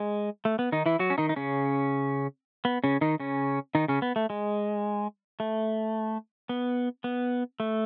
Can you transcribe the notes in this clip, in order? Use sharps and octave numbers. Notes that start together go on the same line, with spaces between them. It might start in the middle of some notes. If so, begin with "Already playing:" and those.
Already playing: G#3
A3
B3
D#3 D#4
E3 E4
F#3 F#4
C#4
D#3 D#4
D#4
C#3 C#4
B3
C#3 C#4
D#3 D#4
C#3 C#4
D#3 D#4
C#3 C#4
B3
A3
G#3
A3
B3
B3
A3